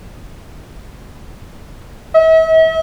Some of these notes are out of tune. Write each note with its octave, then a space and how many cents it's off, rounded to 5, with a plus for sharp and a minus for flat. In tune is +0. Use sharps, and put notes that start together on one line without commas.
E5 -40